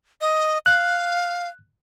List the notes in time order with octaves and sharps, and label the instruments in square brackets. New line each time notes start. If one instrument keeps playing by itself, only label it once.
[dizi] D#5
[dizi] F5 [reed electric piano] F#6